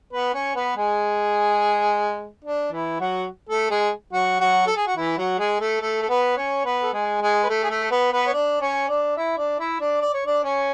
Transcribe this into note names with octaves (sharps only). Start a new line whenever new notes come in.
B3 B4
C#4 C#5
B3 B4
G#3 G#4
D4
E3 E4
F#3 F#4
A3 A4
G#3 G#4
F#3 F#4
F#3 F#4
A4
G#4
F#4
E3 E4
F#3 F#4
G#3 G#4
A3 A4
A3 A4
A4
B3 B4
C#4 C#5
B3 B4
A4
G#3 G#4
G#3 G#4
B4
A3 A4
G#4
A3 A4
A4
B3 B4
B3 B4
C#5
D4 D5
C#4 C#5
D4 D5
E4 E5
D4 D5
E4 E5
D4 D5
D5
C#5
D4 D5
C#4 C#5